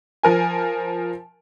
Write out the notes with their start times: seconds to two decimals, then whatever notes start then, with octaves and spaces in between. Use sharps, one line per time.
0.23 F3 A#4 G#5